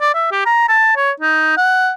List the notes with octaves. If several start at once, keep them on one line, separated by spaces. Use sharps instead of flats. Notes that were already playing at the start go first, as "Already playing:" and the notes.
D5
E5
G4
A#5
A5
C#5
D#4
F#5